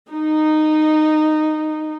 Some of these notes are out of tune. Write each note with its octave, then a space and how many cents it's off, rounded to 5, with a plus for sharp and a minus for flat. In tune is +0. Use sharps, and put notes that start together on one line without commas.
D#4 -10